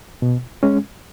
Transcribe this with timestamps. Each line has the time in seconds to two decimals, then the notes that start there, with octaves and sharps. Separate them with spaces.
0.22 B2
0.63 G#3 C#4